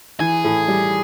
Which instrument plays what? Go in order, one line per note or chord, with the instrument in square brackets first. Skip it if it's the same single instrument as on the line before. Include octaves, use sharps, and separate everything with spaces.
[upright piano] E3 [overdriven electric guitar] G#4
[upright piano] A2
G3